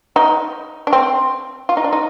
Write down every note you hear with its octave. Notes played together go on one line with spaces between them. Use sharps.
D#4
D4
C4
F4
D#4
D4
D#4